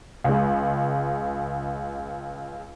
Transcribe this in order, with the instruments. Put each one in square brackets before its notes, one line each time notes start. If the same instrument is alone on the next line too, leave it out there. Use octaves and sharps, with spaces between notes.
[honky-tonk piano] C#2 G#3